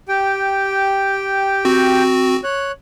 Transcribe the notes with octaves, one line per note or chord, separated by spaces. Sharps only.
G4 G5
C4 F#4
C#5 F#6